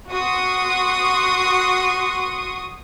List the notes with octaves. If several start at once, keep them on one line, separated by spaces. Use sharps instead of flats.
F#4 C6 C#6 D#6